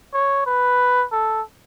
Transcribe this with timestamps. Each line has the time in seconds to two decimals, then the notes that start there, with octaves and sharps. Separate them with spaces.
0.13 C#5
0.46 B4
1.12 A4